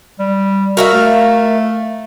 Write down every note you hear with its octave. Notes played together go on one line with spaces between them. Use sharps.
G3
F#4 A#4 E5 F5
A3